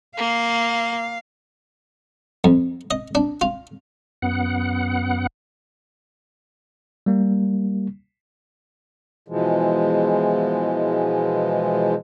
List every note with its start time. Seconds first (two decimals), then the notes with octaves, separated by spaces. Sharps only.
0.18 A#3 F5
2.44 F2
2.91 D#5
3.15 D4
3.41 F4
4.22 F#2 B3 F#5
7.06 G3 A#3
9.28 B2 E3 F3 G#3